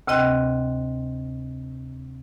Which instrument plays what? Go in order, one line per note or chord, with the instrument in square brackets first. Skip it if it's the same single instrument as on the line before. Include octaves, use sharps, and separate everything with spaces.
[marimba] D2 C3 C4 D#5 G5 F#6